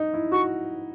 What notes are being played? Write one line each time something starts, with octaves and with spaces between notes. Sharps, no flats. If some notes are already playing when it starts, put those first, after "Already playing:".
Already playing: D#4
E4
F#4 C#6